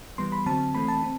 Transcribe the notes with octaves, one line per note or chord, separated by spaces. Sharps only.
E3 G3 B3 C6
B5
D3 F#3 C4 A5
E3 A3 C4 B5
A5
C4